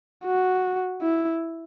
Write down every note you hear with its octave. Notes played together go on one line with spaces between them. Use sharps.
F#4
E4